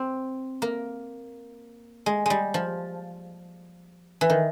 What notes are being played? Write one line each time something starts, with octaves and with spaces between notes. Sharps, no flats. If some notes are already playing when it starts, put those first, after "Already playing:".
Already playing: C4
A#3
G#3
G3 G#3
F3
E3
D#3